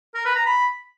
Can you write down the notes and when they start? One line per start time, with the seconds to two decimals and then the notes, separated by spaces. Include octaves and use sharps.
0.15 A#4
0.25 B4
0.36 A#5
0.46 B5